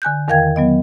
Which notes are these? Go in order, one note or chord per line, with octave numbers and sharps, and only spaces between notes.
D3 G#5 F#6 G6
E2 D#3 A#4 F5 G5 G#6
F#3 B3 D#5